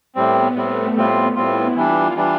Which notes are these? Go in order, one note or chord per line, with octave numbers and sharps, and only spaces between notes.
A2 G3 B3 C4
A2 G3 A3 C4
A2 G3 B3 C4 F4
A2 G3 C4 E4 F4
E3 G3 D4 F4
E3 G3 D4